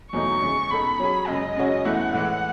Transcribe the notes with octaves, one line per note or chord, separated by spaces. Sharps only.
E2 B2 F#3 A3 D#4 C#6
E2 C#3 G#3
B2 G#3 D#4 A4 B5
F#3 C#4 G#4
F#2 C#3 G#3 D#5
F#2 C#3 G#3 C#4 F#4
E2 B2 A3 E4 F#5
A2 E3 G#3